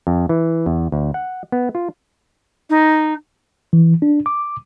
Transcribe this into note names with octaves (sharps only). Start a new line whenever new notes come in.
F2
E3
E2
D2
F#5
B3
F4
D#4
E3
D4
D6